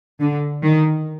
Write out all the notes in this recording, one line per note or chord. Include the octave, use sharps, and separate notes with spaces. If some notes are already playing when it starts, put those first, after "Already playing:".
D3
D#3